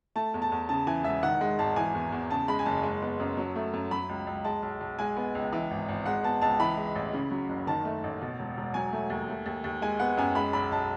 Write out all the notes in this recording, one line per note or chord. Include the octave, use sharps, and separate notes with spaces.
A3 A5
E2
A5
E2
C#3 A5
E3 G#5
E1 E5
D#3 F#5
G#3
G#1 A5
E3 G#5
E2
E2
C#3 A5
G#3 B5
G#5
F#1 A5
G#3
B3
F#2
F#3
A3
F#2
F#3 B5
C#2
C#2
G#3 A5
B1
B1
G#3 G#5
B3
C#2
E3
G#1
G#1
G#3 F#5
B3 A5
C#2 A5
E3 B5
G#3
A1
C#3
F#3
F#1
D#3 A5
A3
A1
B2
E1
E1
F#3 G#5
A3
D#2
A3
D#2
D#2
G#3 G#5
B3 F#5
F#2 G#5
G#3 B5
B1 B5
B1 A5